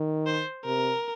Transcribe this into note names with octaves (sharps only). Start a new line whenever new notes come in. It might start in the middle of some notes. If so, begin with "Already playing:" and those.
Already playing: D#3
C5
C3 A#4